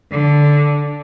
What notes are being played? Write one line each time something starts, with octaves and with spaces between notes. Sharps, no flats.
D3